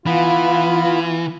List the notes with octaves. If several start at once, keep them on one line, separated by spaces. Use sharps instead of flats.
E3 B3 F4 F5 B5